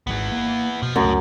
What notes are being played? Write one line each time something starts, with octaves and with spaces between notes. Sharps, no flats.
G#1 G#2 E3 G#3 B3
A#3
B2 F3
C#2 F#2 A2 A3